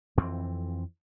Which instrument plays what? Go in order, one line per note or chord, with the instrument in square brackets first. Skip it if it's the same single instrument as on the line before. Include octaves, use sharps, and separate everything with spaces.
[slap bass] F2 E3 C4